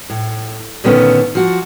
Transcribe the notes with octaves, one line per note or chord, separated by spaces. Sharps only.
A2
A#2 D3 D#3 A3 B3 C#4
F3 F#4